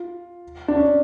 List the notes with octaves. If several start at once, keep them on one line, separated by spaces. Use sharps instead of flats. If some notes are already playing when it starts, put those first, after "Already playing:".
Already playing: F4
D4
C#4